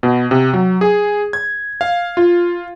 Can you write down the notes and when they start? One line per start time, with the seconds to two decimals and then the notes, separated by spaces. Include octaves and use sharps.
0.03 B2
0.31 C3
0.53 F#3
0.81 G#4
1.33 G#6
1.81 F5
2.17 F4